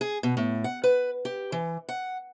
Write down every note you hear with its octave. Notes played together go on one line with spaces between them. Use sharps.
G#4
B2
A2
F#5
B4
G4
E3
F#5